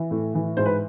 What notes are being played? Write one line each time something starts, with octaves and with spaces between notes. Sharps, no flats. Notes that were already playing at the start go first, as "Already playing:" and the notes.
Already playing: E3
A2
E3
G#2 C5
B4